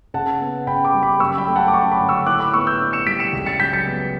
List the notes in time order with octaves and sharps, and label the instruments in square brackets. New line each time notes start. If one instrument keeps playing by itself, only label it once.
[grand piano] C#3 F#5 A5
B3
C#3 G5 B5
B5 D6
G3
B5 D6
F#2 C#6 E6
G5 B5
A3
F#5 A5
D6
C#4 A5 C#6
B5 D6
D3
C#6 E6
A2 D6 F#6
B5 D6
B3 C#6 E6
E6 G6
D4
C#7 E7
G3 B6 D7
C#7 E7
C#2
A6 C#7
F#3 G6 B6
A6 C#7
B3